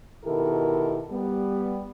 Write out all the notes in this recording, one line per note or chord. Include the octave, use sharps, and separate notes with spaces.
B2 D#3 E4 G4 A4 A#4
G3 B3